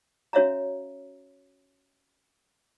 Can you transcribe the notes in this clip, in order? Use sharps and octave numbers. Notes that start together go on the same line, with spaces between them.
C#4 F#4 C#5 E5 F5 A#5